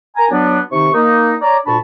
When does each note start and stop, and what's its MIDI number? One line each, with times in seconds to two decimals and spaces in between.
0.17 0.29 70
0.17 0.29 80
0.17 0.29 82
0.31 0.59 54
0.31 0.59 59
0.31 0.59 62
0.72 0.89 48
0.72 0.89 51
0.72 0.89 63
0.72 0.89 85
0.94 1.35 58
0.94 1.35 63
1.42 1.57 73
1.42 1.57 74
1.42 1.57 82
1.66 1.78 38
1.66 1.78 46
1.66 1.78 62
1.66 1.78 81
1.66 1.78 83
1.66 1.78 85